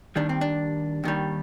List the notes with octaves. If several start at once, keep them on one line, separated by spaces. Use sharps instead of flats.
D#2 D#3 G3 D4
C4
D4
D#2 D#3 G3